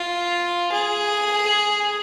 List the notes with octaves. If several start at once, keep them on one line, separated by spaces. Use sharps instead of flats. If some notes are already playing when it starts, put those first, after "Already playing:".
Already playing: F4
G#4